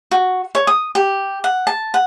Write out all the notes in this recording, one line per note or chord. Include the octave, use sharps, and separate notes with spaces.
F#4
C#5
D#6
G4
F#5
A5
F#5